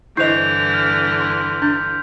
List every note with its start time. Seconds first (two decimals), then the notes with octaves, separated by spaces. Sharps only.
0.17 G2 D3 E3 E4 C5 D#5 G6 F7
0.74 F6 B6
1.20 C6
1.62 D4 G6